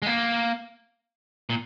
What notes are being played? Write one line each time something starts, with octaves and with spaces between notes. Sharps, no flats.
G#3
A#3
A#2